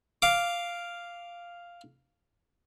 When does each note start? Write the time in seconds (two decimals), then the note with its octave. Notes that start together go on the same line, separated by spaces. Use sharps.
0.22 F5 D6